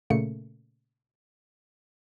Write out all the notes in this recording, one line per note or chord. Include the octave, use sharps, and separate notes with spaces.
A#2 C#3 A3 A#3 C#7